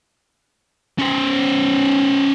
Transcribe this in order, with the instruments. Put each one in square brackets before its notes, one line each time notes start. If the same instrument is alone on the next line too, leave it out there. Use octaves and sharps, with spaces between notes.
[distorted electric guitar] C#4 C5